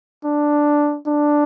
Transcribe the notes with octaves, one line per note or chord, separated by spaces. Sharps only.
D4
D4